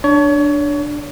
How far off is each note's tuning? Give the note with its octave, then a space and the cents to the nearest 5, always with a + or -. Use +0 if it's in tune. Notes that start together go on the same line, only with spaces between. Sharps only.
D4 +0 C#5 +30